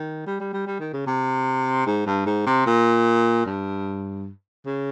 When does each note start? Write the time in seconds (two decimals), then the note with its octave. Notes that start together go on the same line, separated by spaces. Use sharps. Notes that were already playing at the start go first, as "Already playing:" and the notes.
Already playing: D#3
0.27 G3
0.40 G3
0.53 G3
0.67 G3
0.80 D#3
0.93 C#3
1.07 C3
1.86 G#2
2.07 G2
2.26 G#2
2.46 C3
2.66 A#2
3.46 G2
4.66 C#3